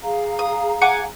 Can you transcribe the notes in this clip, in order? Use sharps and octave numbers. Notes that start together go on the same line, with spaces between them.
G#4 F5 A#5
D#6
F#5 G#5 D6